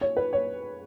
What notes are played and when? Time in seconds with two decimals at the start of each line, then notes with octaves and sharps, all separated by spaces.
0.01 C#5
0.17 B4
0.33 C#5